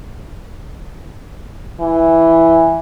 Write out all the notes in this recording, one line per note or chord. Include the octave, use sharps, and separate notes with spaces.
E3